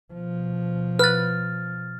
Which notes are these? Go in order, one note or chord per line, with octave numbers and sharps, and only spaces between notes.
B2 F3
B4 F6 A6